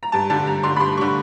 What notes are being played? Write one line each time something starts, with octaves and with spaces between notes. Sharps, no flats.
A#5
G2 A5
D3 G3 A5
G2 A#5
D3 G3 C6
B5
G2 C6
D3 G3 C#6